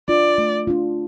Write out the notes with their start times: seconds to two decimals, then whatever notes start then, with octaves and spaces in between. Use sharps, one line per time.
0.08 D4 F4 D5
0.38 A3
0.67 D4 F4